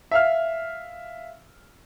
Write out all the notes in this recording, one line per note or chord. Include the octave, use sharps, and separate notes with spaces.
E5 F5 F6